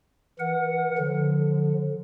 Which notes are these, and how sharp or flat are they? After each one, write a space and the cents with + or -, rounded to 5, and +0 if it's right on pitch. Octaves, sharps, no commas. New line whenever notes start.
E3 +0 A#4 +40 F#5 +0
D3 +0 F3 +25